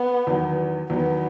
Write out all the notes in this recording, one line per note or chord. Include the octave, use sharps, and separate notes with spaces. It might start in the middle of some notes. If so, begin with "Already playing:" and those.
Already playing: B3
E2 D#3 F#3
E2 D#3 F#3 B3